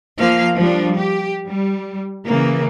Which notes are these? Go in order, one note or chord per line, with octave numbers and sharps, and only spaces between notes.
F3 A#3 F5
F3 G3 D4
G4
G3
C#3 E3 A#3